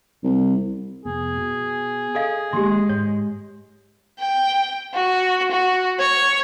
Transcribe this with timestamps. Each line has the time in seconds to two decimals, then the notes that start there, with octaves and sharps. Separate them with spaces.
0.23 C2
1.05 F1 B3 G#4
1.37 B2
2.15 A4 D#5 F5
2.53 D#3 G#3 A#3 G4 C6
2.89 G#2 C#5
4.18 G5
4.93 F#4
5.50 F#4
5.99 C#5